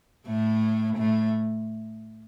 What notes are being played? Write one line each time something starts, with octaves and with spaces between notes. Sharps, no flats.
A2 A3
A2 A3